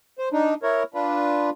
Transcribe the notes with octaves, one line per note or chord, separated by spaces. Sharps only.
C5
D4 D#4
E4 A#4 C#5
D4 F4 B4